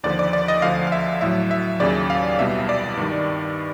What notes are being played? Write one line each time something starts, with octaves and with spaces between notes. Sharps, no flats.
D#2 D3 F3 D5
D5
D5
D#5
D2 D3 F3 F5
F5
E5
A2 F#3 E5
E5
D#2 C#3 F#3 D5
F5
C2 B2 G3 E5
D5
G2 D#3 G3